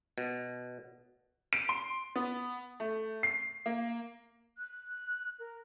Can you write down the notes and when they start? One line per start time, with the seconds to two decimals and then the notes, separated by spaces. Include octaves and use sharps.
0.18 B2
1.53 D7
1.69 C6
2.16 B3
2.80 A3
3.23 C7
3.66 A#3
4.58 F#6
5.40 A#4